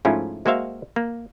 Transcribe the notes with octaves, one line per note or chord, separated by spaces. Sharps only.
G#2 F3 A3 C#4 E4 F4
G#3 A#3 F#4 C5 E5 F5
A#3